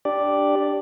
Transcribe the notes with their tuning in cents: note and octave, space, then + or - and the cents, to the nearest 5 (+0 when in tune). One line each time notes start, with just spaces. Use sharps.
D4 +0 G4 +0 D5 +0